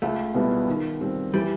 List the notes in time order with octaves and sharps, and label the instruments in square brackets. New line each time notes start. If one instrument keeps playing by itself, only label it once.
[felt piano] C#2 [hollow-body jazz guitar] A3
[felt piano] B2 G3 B3 E4
D#3
G3 C4
[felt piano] E3 [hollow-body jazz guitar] G3